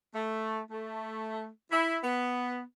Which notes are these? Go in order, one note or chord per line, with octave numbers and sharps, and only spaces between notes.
A3
A3
E4
B3